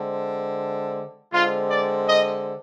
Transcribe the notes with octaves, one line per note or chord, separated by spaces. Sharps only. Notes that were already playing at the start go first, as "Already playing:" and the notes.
Already playing: D3 G#3 C4
D3 G#3 C4 F4
D5
D#5